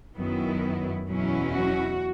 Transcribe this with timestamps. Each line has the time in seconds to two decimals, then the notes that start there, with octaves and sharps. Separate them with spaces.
0.15 F#2 D#3 F#3 B3 E4
1.07 E2 B2 F#3 C#4 E4
1.52 F#4